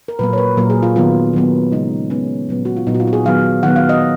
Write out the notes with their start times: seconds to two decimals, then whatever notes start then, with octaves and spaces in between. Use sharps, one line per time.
0.08 A#4
0.19 A#2 F#3 A#3 B4
0.33 C#5
0.38 B4
0.57 A#2 F#3 A#3 A#4
0.70 G#4
0.83 F4
0.96 D#3 F#3 B3 F4
1.33 D#3 F#3 B3
1.72 C#3 G#3 B3 D#4
2.10 C#3 G#3 B3 C#4
2.49 A#2 F#3 B3
2.65 F#4
2.77 F4
2.87 A#2 F#3 B3 D#4
2.95 F#4
3.00 F4
3.08 F#4
3.13 G#4
3.25 D#3 F#3 B3 F5
3.63 D#3 F#3 B3 F#5
3.76 F5
3.89 D#5